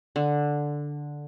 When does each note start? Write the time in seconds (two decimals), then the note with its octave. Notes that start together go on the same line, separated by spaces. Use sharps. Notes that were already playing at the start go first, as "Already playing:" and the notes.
0.16 D3